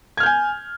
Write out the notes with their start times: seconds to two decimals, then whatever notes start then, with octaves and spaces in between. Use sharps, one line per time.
0.17 G#6
0.20 F6
0.23 G6
0.26 G#5